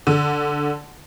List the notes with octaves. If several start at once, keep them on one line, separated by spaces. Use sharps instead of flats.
D3